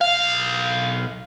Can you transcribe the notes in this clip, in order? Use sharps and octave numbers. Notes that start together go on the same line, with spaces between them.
B1 F5